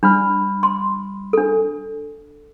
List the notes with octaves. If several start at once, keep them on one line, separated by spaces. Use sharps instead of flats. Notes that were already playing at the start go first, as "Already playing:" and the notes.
G3 D4 B5 F6
C6
D4 A4